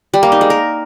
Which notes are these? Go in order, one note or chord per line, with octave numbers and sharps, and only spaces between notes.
G3
A#3
D#4
G#3
A#4